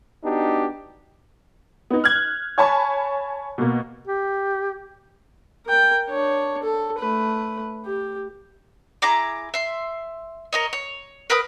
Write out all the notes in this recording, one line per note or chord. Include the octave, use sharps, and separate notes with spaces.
B3 D4 D#4 F#4 G4
B3 D#4
F6 F#6 G#6
C#5 G#5 A5 B5 C#6
B2 A#3
G4
A#4 G5
D4 C#5
A4
A3 B4
G4
E4 G#4 A#5 D6
E5 C6
A#4 C#5 D#5
C#5
A#4 B4 B5 D#6